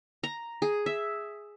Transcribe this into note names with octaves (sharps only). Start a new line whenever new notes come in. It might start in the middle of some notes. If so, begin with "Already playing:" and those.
A#5
G#4
E5